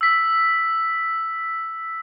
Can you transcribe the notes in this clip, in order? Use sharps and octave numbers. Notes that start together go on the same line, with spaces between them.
E6 B6